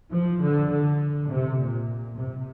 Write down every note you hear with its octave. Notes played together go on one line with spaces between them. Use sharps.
F3
D3
D3
C3
A#2
C3